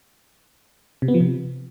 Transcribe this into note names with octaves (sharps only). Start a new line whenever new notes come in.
C3
B3
F3
C3